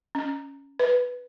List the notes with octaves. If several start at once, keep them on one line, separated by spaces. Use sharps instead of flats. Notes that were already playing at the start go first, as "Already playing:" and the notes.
C#4
B4